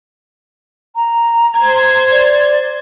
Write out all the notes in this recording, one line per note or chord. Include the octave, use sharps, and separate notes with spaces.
A#5
C5 G#6
D5